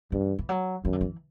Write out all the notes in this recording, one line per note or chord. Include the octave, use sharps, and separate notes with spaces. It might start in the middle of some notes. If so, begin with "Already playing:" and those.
G2 E3
E3
F#3
F#2 E3
D3
E3